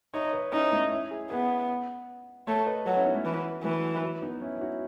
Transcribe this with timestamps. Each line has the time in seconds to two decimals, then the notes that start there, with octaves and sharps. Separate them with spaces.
0.14 D#4 C#5 E5
0.27 C#5
0.33 B4 D#5
0.53 C#4 D#4 E4
0.72 A3 C#4
0.92 C#4 E4
1.11 E4 G#4
1.30 B3 G#4 B4
2.47 A3 A4 C#5
2.66 B4 D#5
2.86 F#3 F#4 A4
2.96 C#4 E4
3.05 B3 D#4
3.15 A3 C#4
3.25 E3
3.63 E3 F#3 A3
4.02 F#3
4.22 B3 D#4
4.41 C#4 E4
4.56 E4
4.61 D#4 F#4